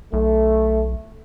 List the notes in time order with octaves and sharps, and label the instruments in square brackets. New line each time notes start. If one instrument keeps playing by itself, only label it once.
[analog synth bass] B1 [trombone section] A3